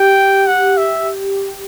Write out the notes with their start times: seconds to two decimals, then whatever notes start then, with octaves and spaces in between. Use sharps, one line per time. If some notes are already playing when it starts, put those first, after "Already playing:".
Already playing: G4 G5
0.47 F#5
0.77 E5